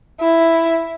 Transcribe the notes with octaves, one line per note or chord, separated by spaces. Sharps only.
E4